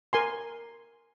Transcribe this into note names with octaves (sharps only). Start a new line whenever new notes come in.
A#4 G#5 C6